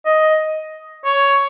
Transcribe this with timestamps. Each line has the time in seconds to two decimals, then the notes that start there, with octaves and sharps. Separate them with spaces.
0.05 D#5
1.05 C#5